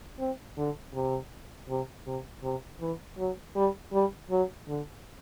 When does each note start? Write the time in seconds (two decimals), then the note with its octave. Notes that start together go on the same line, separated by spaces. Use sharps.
0.19 C4
0.57 D3
0.94 C3
1.69 C3
2.06 C3
2.43 C3
2.80 E3
3.18 F#3
3.56 G3
3.93 G3
4.31 F#3
4.68 D3